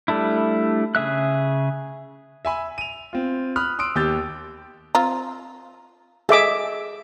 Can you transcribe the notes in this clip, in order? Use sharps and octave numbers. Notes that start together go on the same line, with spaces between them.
G3 A3 D4 E4
C#3 G#4 E5 F#6
E5 G#5 B5
D#7 F7
C4 F4
B5 D#6 F6 F#6
C6 D#6 E6 D7
D#2 G4 E6 G6 A6
C4 F4 A#5
G#4 A4 D#5 E5 D6